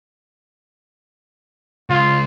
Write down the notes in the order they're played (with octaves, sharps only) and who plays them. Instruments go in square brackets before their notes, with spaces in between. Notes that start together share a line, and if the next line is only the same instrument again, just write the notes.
[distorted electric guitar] C#2 [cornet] F4